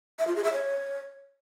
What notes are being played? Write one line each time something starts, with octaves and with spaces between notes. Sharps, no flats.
E5
F4
G#4
E5
C#5